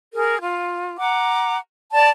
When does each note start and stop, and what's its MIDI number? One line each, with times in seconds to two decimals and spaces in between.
0.14 0.37 68
0.14 0.37 70
0.40 0.96 65
0.98 1.57 78
0.98 1.57 82
0.98 1.57 86
1.91 2.09 74
1.91 2.09 81